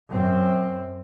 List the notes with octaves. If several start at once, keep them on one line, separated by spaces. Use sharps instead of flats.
F#2 C4